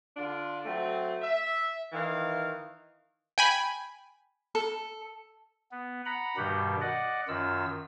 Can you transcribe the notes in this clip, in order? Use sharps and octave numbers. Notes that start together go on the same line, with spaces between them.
D3 D4 F4
F#3 A3 C4
E5
D#3 E3 F5
G5 G#5 B5
A4
B3
F#5 A#5 B5
G2 B2 D#3 G3 G4
D5 D#5 F#5
F#2 D#3 F4 E6